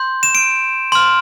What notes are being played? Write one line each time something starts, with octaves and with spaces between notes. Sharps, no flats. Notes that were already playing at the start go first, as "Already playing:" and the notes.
Already playing: C6 G6
E7
D7
C6 F6